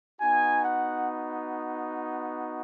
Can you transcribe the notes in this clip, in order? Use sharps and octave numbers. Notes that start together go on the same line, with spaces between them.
B3 D#4 F#4 G#5
F#5